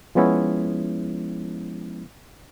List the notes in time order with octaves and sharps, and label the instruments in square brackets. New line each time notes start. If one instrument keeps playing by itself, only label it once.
[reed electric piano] F3 G#3 B3 C#4 E4